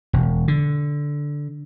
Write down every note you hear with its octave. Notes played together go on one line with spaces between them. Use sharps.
E1
D3